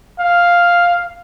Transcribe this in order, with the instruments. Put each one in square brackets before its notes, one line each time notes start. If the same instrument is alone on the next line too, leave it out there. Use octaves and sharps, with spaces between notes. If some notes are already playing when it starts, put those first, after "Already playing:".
[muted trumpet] F5